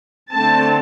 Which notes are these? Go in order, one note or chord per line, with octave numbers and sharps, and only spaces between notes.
D3 A3 C4 A5